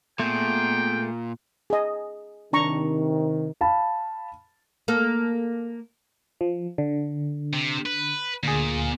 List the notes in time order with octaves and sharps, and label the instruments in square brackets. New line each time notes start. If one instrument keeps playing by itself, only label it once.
[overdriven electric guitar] A#2 [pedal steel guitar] A3 G#4 [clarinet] B3 [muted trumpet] G5
[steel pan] G#4 D#5
[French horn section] C3 D#3 [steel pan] D4 A#5 C#6
[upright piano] F5 A5 B5
[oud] A#3 A4
[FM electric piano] F3
D3
[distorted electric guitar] C3
B4
[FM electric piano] D2 G#4 [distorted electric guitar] A#2